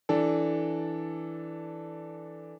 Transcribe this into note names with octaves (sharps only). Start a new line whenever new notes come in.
E3 D4 A4